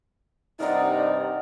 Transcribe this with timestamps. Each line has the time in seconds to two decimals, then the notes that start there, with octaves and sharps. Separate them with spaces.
0.60 G2 C3 D#4 A#4 D5 D#5 F#5